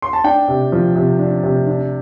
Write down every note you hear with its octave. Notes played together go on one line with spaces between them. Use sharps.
C6
A5
D4 G5
C3
F3
C3
D4
C3
D4